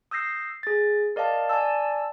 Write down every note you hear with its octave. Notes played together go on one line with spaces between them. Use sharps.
D#6 E6 G6 A#6 C7
G#4 A6
A#4 D5 D#5 F5 A5
D5 G#5 A5 E6